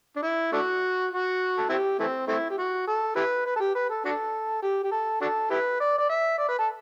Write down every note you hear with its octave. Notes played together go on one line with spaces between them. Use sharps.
D4
E4
A3 D4 F#4
F#4
A4
C4 E4 G4
E3 A3 C4
A3 C4 E4
G4
F#4
A4
E4 G4 B4
B4
A4
G4
B4
A4
D4 F#4 A4
G4
G4
A4
D4 F#4 A4
E4 G4 B4
D5
D5
E5
D5
B4
A4